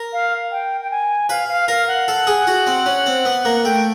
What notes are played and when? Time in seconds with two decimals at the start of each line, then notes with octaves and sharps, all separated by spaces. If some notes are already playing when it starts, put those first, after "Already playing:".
Already playing: A#4
0.13 F5
0.51 G5
0.81 G5
0.91 G#5
1.29 B4 F5
1.49 F5
1.68 A#4 F5
1.88 F#5
2.08 A4
2.27 G#4
2.47 F#4
2.67 C4
2.86 C#4
3.06 C4
3.25 B3
3.45 A#3
3.64 A3 G5